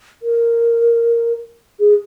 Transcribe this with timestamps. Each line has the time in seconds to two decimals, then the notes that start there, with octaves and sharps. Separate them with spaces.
0.23 A#4
1.80 G#4